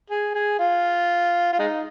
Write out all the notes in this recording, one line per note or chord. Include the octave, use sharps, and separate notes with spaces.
G#4
G#4
F4
F4
G#3 D#4